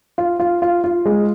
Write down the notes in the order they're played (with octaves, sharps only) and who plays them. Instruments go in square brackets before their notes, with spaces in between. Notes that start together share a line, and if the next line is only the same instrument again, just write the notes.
[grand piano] F4
F4
F4
F4
G#3